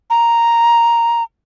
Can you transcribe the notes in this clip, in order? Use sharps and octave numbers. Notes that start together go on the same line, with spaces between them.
A#5